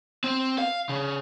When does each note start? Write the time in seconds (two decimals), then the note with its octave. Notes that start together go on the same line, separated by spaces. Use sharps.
0.24 C4
0.58 F5
0.89 C#3